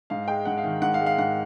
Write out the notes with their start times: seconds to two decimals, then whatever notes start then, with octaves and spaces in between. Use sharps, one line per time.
0.10 G#2 F5
0.28 G#3 G5
0.45 G#2 F#5
0.58 F5
0.64 D#3
0.82 G#2 F#5
0.94 F5
0.99 G#3
1.06 F5
1.18 G#2 F#5